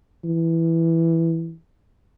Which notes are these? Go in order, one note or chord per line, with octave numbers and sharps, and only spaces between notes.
E3